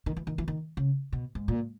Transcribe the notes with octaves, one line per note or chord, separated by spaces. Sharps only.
D#3
E3
D#3
E3
D#3
C#3
B2
G#2
A#2